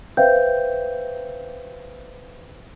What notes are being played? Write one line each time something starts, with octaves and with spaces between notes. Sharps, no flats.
B4 C5 E5 F5 G5 G6